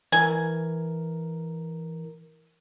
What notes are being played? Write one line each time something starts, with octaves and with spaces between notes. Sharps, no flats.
E3 A#4 G#5